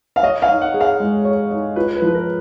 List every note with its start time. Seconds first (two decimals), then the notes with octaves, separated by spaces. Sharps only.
0.16 F5
0.23 C#5 D#5
0.42 F5
0.49 D#4
0.61 F#5
0.74 G#4
0.81 F5
1.00 G#3
1.25 C#5
1.51 D#4
1.76 F4 B4
1.95 B4
2.02 F3
2.07 B4
2.15 A#4